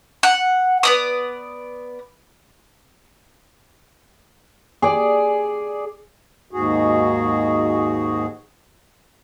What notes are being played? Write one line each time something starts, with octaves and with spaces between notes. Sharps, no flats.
F#5
B3 D5 D#6
G#4 D5
D#2 G#2 F#4 G#4